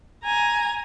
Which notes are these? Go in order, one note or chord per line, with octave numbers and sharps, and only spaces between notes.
G#5 A#5